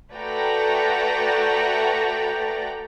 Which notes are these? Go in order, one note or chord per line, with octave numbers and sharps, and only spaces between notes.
A3 F#4 B4 D5 G5 A#5